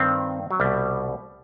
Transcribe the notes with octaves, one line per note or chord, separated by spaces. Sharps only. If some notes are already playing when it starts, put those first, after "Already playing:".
Already playing: G2 D#3 C4
F#3
C2 B2 G3